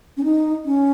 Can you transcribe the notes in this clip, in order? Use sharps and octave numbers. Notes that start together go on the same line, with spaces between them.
C#4
D#4
C#4